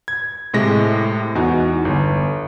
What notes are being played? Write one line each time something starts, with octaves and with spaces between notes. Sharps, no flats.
G#6
A2 C3 G#3 A#6
E2 D#4 F#4
G1